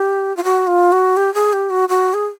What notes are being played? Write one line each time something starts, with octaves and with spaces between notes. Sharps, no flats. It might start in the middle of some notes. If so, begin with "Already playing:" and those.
Already playing: G4
F4
F#4
F4
F#4
G4
G#4
G4
F#4
F#4
G#4